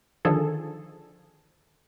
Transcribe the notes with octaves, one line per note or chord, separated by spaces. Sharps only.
D3 D#3 F3 G#4 A4